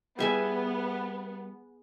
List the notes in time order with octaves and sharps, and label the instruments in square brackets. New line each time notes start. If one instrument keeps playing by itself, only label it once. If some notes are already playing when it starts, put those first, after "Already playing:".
[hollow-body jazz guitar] G3 E4 [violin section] B3 [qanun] G#4 E5 G#5